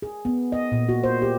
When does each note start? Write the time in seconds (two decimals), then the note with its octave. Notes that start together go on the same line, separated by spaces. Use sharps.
0.02 G#4
0.25 B3
0.52 D#5
0.72 A#2
0.89 F#4
1.04 C5
1.22 G4